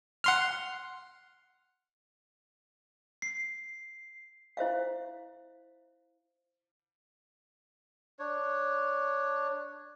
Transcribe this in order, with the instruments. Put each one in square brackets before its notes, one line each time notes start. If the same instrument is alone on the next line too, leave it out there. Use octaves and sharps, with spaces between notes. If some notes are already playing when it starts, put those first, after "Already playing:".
[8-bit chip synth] F#5 C6 F6
[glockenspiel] C7
[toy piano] E4 C5 E5 F5
[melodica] D4 C#5